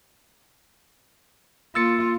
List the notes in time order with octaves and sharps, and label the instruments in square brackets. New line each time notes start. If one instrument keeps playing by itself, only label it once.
[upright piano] A#3 [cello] F4 [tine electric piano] E6 A6 C#7